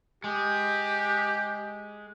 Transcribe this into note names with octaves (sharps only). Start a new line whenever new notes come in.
G#3 G4